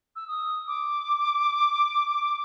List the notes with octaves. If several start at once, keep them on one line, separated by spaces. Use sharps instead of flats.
E6
D#6
D6